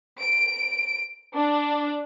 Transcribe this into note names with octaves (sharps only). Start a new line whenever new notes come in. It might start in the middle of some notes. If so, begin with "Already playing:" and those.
D7
D4